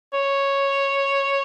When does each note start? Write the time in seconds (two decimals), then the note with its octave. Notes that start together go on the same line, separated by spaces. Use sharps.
0.14 C#5